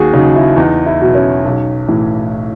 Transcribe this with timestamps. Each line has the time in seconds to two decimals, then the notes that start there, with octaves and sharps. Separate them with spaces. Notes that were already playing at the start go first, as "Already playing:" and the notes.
Already playing: D#2 F#4 G#4
0.13 C#3 F#3 D#4
0.36 E4
0.56 E2 D#4
0.86 E4
1.01 B2 F#3
1.15 C#4
1.45 B1
1.88 A2 E3